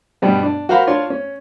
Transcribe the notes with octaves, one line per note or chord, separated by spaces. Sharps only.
G2 B2 G3 B3
D4
F#4 A#4 C5 F5 A#5 B5
D4 F4 C#5 C6
C#4